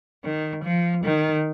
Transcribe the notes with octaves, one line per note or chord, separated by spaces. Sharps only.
D#3
F3
D#3